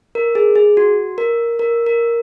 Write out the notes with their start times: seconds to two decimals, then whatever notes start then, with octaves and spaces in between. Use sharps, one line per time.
0.15 A#4
0.35 G#4
0.55 G#4
0.77 F#4
1.18 A#4
1.59 A#4
1.86 A#4